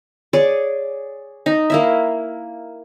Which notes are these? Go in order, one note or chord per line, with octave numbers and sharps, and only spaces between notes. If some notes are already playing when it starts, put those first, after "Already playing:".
G#4 C#5 D5
D#4
A#3 E4 E5